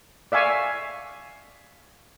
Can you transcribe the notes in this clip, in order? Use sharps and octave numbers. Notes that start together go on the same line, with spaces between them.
D5 E5 F5 G#5 C#6